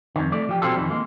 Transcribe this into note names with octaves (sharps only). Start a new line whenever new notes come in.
F2 D#3
A3 D5
F3 G4
B2 F#3 C4 F4 G4 A4
F2 D#3 E3
G#3 A#3